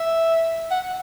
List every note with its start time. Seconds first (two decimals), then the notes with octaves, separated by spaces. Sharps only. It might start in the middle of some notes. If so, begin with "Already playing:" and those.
Already playing: E5
0.71 F#5